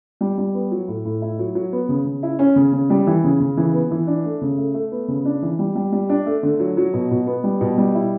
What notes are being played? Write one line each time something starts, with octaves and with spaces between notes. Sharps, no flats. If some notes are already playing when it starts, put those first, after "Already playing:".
G3
G3
B3
F#3
A2
A2
E4
F#3
F#3
B3
C#3
C#3
E4
C#4
C#3
C#3
G3
E3
C#3
C#3
E3
B3
E3
D4
A3
C#3
A3
A3
B3
C#3
D4
E3
G3
G3
G3
D4
A3
D3
F#3
F#3
B2
B2
B3
G3
B2
G3
E4